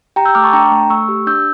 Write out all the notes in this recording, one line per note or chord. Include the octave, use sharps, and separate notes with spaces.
G4 G5 A#5
E6 G6
A3 D6 F6
A5 C#6
D4 G5 A#5
A3
A3 C#6 E6
G4
D4 E6 G6